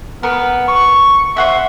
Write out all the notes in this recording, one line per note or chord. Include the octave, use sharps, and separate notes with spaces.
B3 A#4 B4
C#6
C5 E5 F#5 C#6